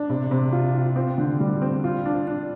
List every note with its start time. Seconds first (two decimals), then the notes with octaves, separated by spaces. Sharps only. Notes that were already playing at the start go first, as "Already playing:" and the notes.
Already playing: D4
0.10 C3
0.31 C3
0.53 F4
0.74 F4
0.96 C4
1.18 D3
1.40 G3
1.62 C4
1.84 F4
2.06 D4
2.27 D4